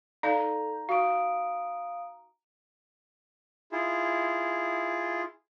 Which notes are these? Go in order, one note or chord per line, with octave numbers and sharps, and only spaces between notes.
D#4 A4 D5 F5 A#5 G6
F#4 F5 D#6 D7
E4 F4 G#4